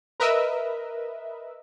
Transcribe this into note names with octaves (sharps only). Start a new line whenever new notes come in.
A#4 B4 D#5 E5